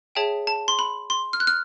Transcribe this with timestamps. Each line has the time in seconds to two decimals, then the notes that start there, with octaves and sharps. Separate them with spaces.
0.15 G#4 C#5 E5 G5 A5
0.47 A5
0.68 C6
0.79 B5
1.10 C6
1.33 F6
1.40 F#6
1.47 F6